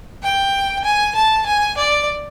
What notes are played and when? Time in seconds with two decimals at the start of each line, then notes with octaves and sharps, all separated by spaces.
0.22 G5
0.84 G#5
1.15 A5
1.46 G#5
1.77 D5